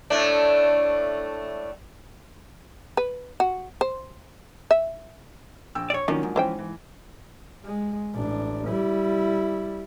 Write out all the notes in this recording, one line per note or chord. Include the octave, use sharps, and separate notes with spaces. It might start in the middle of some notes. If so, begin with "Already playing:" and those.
A2 A3 D4
B4
F#4
C5
E5
A#1 G5 E6
C#5 D5
D#3 F3 F#3 A#3 C#4 D4
G#2
E3 F3 C#4 E4 C5 G5
E3
G#3
A1 D4
G3 E4